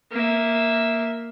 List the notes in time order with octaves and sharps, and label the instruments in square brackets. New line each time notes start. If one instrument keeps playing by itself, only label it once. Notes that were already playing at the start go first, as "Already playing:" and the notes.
[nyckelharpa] A#3 E5